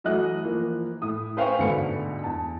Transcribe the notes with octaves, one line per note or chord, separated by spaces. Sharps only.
E3 F#3 A3 D#5 F#6
E3 F3 A#3
A2 E4 D#6
B4 C5 F5 G5 G#5 C#6
D2 G#2 B2 D3 B5 C#7
E2 A5